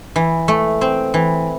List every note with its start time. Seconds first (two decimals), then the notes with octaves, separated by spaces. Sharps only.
0.16 E3
0.48 A3
0.81 C4
1.14 E3